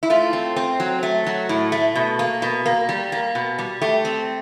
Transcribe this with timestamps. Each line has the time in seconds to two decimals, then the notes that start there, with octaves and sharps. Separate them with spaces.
0.03 E4
0.10 A3 F4
0.33 C4
0.56 C4
0.80 F#3
1.03 A3
1.26 F#3
1.49 A2
1.72 A3
1.95 B2
2.19 A#3
2.42 B2
2.66 A#3
2.89 G3
3.12 A#3
3.35 B2
3.58 G3
3.81 A3 G4
4.05 C4